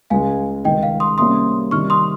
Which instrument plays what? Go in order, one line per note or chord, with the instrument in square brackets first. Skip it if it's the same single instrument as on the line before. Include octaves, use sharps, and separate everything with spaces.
[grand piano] C#2 C#3 G#3 [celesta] F5 G#5
[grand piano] C#2 C3 D#3 [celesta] D#5 G5
[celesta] F5
C6 D#6
[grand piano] C3 G3 A#3 C#4 [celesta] C6 D#6
[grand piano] C3 D#3 G3 [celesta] C#6 F6
[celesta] C6 D#6